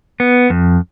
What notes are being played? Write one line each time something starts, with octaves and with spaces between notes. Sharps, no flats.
B3
F2